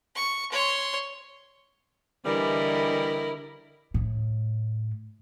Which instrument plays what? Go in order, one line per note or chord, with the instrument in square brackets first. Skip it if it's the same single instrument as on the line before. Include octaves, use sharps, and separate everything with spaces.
[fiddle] C#6
C#5 C6
[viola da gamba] D3 D#5 [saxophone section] E3 G3 [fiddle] E4 A#4
[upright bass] A2